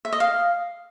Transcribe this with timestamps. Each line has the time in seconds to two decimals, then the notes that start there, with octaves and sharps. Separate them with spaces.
0.05 E5
0.12 D#5
0.20 F5